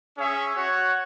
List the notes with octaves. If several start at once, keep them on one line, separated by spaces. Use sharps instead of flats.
C#4 G#4 C#5 E5
F#4 C#5 F#5